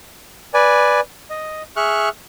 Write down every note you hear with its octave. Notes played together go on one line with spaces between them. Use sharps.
B4 D5 G#5
D#5
G#4 E5 C#6 F6 F#6